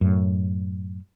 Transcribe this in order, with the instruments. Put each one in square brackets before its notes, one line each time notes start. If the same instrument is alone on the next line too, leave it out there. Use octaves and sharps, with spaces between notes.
[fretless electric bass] F#2 A2